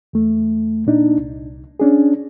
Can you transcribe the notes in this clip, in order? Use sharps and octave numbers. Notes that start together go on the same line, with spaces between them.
E2 A3
A#2 D4 D#4
C2
C#4 D4 G#4